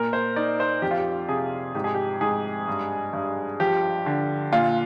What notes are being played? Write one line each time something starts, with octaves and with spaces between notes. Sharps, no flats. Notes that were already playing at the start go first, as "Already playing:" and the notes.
Already playing: A#2 A#4
C5
D#4 D5
C5
F2 G4
F4
G4
C3 G#4
G#2 G4
G#4
G4
G#2 G#4
G2
G2
F3 G4
D3
A#2 F4